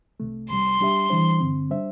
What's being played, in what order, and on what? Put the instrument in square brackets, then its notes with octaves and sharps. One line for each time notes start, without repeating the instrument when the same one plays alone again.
[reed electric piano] C2 C3 A3
[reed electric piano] C2 C3 G3 [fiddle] C6
[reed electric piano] G3 D4 G4 E5
E3 G3 D4 C5
G2 D3 C4
G3 D4 C5 E5